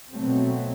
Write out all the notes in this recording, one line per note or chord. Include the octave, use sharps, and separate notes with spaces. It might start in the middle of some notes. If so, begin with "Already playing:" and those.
B2 F#3 A3 C4